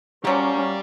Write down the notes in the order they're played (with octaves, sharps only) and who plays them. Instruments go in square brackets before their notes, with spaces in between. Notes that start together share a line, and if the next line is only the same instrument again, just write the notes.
[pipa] F3 F#3 A#3 [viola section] C#4 [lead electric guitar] G4 D5